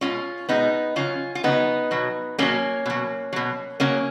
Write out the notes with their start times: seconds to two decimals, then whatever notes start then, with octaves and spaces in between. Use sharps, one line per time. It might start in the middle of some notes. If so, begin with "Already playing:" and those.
0.01 B2 G#3 C#4 F4
0.49 B2 G#3 B3 D#4
0.96 C#3 F#3 C#4 F4
1.35 F4
1.44 C#3 F#3 B3 D#4
1.91 B2 F#3
2.38 B2 F#3 A#3 C#4
2.86 B2 F#3
3.33 B2 F#3
3.80 C#3 F#3 A#3 C#4